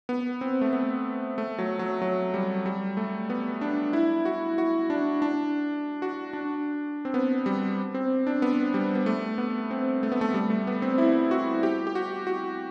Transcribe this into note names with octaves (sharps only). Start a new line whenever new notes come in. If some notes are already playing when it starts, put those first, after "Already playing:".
B3
C4
A3
B3
A3
F#3
F#3
F#3
G3
G3
A3
B3
D4
E4
F#4
F#4
D4
D4
F#4
D4
C4
B3
G3
C4
D4
B3
G3
B3
A3
B3
C4
A3
B3
A3
G3
A3
B3
C4
E4
F#4
G4
G4
F#4
F#4